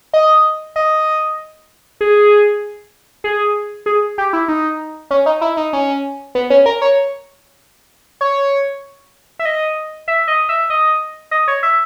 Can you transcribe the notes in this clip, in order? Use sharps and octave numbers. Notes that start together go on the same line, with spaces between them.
D#5
D#5
G#4
G#4
G#4
G4
E4
D#4
C#4
D#4
E4
D#4
C#4
B3
C#4
A#4
C#5
C#5
E5
D#5
E5
D#5
E5
D#5
D#5
C#5
E5